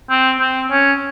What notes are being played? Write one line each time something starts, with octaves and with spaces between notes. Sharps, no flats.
C4
C4
C#4